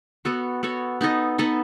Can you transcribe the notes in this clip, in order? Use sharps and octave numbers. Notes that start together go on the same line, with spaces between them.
B3 F#4 A4 C#5
B3 F#4 A4 C#5
B3 D#4 A4 D#5
B3 D#4 A4 D#5